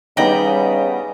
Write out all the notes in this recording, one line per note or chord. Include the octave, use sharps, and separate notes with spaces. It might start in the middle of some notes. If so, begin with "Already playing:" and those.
C#3 G3 B3 D#4 D5 G5 A#5